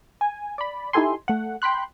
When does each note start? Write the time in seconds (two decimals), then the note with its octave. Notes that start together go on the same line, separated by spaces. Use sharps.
0.21 G#5
0.58 D5 B5
0.93 D#4 E4 G4 A4 G#5 C6
1.28 A3 F#5
1.62 G5 B5 C6 F#6